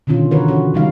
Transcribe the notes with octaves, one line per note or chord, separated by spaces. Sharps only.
B2 D3 D#3 C#4 F4
D3 E3 F#4 A#4 B4 C#5
C#4 F#4
C3 D#3 G3 D#4 F5